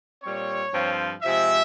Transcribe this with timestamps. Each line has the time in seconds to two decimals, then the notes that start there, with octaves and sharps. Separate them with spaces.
0.23 A#2 G3 C4 C#5
0.73 G2 F3 C4 F4
1.22 C3 F3 G#3 E5